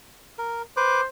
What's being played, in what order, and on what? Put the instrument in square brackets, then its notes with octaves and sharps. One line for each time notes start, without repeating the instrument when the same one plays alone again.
[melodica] A#4
[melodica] B4 D6 [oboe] C5